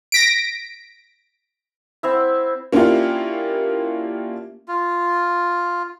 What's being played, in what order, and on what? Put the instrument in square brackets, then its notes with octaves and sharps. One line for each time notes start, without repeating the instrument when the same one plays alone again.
[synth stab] A#6 B6 D7
[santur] C4 E4 E5
[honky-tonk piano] A#3 C#4 D4 E4 F4 G4
[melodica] F4